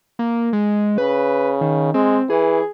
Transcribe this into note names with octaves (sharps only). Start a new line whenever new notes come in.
A#3
G#3
C#3 B4
D#3
G#3 C4
E3 G#4